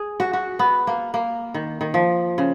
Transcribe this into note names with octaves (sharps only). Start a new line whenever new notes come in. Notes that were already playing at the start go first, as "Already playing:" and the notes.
Already playing: G#4
F#4
F#4
B3
A#3
A#3
D#3
D#3
F3
C#3